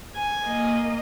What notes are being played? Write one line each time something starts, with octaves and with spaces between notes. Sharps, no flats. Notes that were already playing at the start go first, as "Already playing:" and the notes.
G#5
A#3 D#5